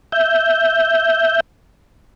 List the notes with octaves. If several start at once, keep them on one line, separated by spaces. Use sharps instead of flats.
E5 G6